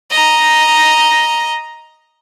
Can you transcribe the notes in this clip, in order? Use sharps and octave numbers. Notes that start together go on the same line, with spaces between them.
D#5 A#5